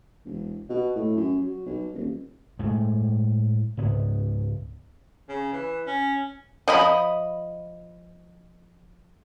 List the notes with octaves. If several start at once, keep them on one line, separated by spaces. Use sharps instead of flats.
E1
B2
A2
F#2
F#3
B1
D#1
A2 G#3 A3
C#2 G#2 B3
C#3
E3
C#4
F3 D#5 B5